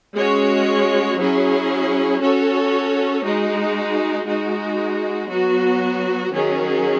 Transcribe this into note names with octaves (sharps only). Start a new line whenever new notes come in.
G#3 C#4 F#4 C#5
F#3 C#4 E4 G#4
C#4 F#4 A4 C#5
G#3 D#4 F#4
G#3 D#4 F#4
F#3 B3 F#4
D#3 F#3 C#4 G#4